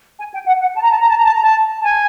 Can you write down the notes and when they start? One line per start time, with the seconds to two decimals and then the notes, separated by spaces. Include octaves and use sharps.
0.18 G#5
0.32 G5
0.46 F#5
0.60 F#5
0.74 A5
0.82 A#5
0.91 A5
1.00 A#5
1.09 A5
1.17 A#5
1.25 A5
1.34 A#5
1.43 A5
1.81 A5
1.84 G#5